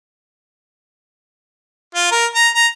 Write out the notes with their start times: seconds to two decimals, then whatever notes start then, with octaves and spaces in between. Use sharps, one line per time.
1.95 F4
2.11 A#4
2.35 A#5
2.55 A#5